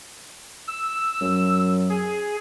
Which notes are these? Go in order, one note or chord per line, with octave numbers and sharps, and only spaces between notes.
E6
F#2
G#4